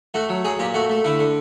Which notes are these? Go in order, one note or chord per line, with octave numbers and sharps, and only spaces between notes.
A3 F#4
F#3
F#3 G#4
A#2 G4
A3 F#4
A3
D3 E4
D3